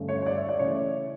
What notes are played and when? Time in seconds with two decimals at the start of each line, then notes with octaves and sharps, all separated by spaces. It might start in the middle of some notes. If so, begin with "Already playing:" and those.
Already playing: G2 D3 A3 C#4
0.08 C#5
0.22 C#5
0.26 D5
0.37 E5
0.49 D5
0.59 C#3 E3 A3 C#4 C#5